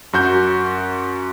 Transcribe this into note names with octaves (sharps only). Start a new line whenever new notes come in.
F#2 F#4 G6